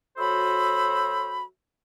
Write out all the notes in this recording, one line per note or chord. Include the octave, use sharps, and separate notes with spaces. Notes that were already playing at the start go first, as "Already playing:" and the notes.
F#3 F#4 A4 C5 E5 B5